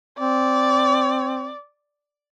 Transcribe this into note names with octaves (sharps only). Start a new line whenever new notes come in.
C4 D5